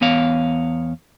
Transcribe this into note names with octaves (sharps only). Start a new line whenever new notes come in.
E2 B3 C#5 F5